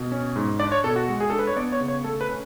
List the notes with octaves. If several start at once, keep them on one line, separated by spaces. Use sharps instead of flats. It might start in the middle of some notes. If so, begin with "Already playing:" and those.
Already playing: B2
C#4
G#2
D4 D5
C#5
B2 A4
F#4
G#3
G#4
D4 A4
B4
C#5
B3 D5
C#5
C#3
C#5
A3 A4
B4
C#4